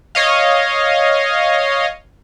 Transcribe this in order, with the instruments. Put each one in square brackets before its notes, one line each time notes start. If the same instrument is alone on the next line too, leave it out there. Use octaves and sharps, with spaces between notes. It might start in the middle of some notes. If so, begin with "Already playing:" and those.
[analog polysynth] C#5 D#5 F5